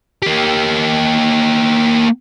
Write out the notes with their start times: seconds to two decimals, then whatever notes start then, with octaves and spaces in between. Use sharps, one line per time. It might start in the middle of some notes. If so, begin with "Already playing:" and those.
0.23 A#3 G4